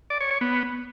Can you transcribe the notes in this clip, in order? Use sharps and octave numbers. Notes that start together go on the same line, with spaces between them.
D5
C#5
C#5
B3